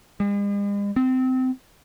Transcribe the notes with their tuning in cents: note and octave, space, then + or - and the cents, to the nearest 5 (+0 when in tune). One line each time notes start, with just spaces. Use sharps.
G#3 -45
C4 -25